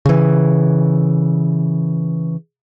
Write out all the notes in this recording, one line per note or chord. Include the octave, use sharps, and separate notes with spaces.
C#3 E3